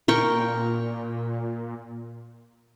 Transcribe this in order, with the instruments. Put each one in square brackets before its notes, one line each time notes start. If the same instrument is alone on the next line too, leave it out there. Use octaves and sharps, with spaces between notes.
[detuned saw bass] A#2 [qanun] A#4 G5 C#6